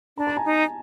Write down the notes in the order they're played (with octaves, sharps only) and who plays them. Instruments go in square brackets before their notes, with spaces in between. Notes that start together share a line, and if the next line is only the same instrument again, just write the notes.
[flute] D4 [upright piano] A#5
[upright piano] A5
G#5 A#5
[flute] D#4